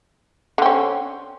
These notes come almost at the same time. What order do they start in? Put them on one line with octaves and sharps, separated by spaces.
D3 C4 C#4